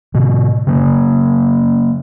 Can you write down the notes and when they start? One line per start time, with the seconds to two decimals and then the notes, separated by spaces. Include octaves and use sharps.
0.14 A2 C3
0.67 C#3 F#3 A#3